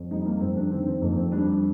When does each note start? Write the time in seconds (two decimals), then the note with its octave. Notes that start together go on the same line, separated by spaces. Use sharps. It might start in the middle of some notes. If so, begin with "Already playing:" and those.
Already playing: F2
0.11 G3 D#4
0.26 A#3
0.41 F2 C4
0.56 D4
0.71 D#3 C4
0.87 C4
1.02 F2 A#3
1.17 C4
1.32 G3 D4